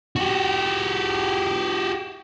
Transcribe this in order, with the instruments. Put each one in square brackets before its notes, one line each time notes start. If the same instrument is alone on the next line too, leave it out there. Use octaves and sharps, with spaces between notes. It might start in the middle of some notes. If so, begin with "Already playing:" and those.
[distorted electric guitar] F#4 G4